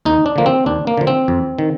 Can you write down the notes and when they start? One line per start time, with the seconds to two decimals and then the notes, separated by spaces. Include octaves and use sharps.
0.05 D#2 D#4
0.26 D4
0.36 D3 F3 A#3
0.46 C4
0.66 D#2 D4
0.87 A#3
0.97 D3 F3
1.07 C4
1.28 F2
1.59 D#3